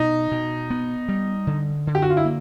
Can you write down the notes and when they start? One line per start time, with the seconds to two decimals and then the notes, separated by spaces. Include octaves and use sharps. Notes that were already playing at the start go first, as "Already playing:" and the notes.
Already playing: B2 D#4
0.32 B2
0.70 B3
1.09 G3
1.47 D3
1.87 D3
1.95 G4
2.02 F#4
2.10 F4
2.17 E4
2.25 A#3